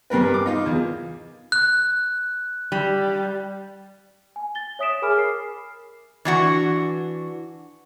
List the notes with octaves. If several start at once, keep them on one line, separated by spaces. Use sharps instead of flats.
G2 G3 A#4 B4
D6
D#4 F4
E2
F#6
G3
G#5
A6 G7
C#5 E5 D#6 B6 D7 E7
G#4 A#4 G#5 B5 D6 F6
A#4 C7
E3 D4 F#4